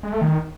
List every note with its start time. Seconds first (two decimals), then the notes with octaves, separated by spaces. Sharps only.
0.03 G#3
0.12 A3
0.21 D#3